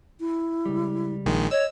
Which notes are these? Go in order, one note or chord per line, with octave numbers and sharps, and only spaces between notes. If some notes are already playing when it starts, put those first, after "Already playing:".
E4
C#2 G3
A#1 D#3 G#3
C#5 D#5 E6